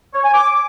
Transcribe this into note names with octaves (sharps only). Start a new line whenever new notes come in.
C#5
G#5
D6